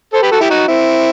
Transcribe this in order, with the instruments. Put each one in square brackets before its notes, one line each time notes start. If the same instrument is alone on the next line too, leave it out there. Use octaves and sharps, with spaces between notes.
[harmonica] A4 C5
G4 B4
F#4 A4
E4 G4
D#4 F#4
C4 E4